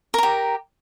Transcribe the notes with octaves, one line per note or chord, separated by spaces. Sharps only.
G4 A#4 A#5